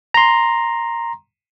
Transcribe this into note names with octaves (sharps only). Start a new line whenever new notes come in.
A#5 C6